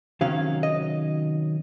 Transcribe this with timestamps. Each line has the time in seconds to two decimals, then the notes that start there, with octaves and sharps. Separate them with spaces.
0.21 C3 D#3 F#3 C#4 F5
0.63 D#5